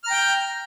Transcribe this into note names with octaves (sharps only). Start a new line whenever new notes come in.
G5 A#5 F6 G6